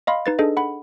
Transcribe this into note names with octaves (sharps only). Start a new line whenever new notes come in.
D#5 F5 B5 C6
D#4 B4 A6
D4 G#4 A4 D#5
F#5 B5